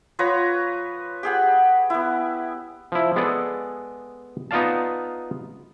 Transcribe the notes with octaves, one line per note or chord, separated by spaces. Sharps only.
F3 B4 C#5 A#5
G4 G#4 F#5
B3 E4
F3 E4
G#3 B3 G#4 A4 D5
B3 D#4 F4 D5 F5 A5